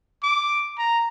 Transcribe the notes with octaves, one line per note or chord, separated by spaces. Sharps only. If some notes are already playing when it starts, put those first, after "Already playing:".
D6
A#5